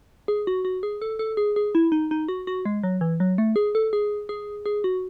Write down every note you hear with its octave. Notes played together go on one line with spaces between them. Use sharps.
G#4
F#4
F#4
G#4
A4
A4
G#4
G#4
E4
D#4
D#4
F#4
F#4
G#3
F#3
E3
F#3
A3
G#4
A4
G#4
G#4
G#4
F#4